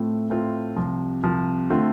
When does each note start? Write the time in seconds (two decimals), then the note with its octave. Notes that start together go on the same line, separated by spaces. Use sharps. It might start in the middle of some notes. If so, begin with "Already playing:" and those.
Already playing: A2 A3 C4 F4
0.30 A2 A3 C4 F4
0.76 C2 C3 F3
1.23 C2 C3 F3
1.70 D3 A3 C4 F4